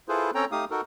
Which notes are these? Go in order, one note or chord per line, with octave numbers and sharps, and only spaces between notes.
E4 F4 G#4 A4 B4 C5
C4 C#4 A4 C#5 G5 A#5
A3 D#4 G4 F5 D#6
D#4 F#4 A4 A#4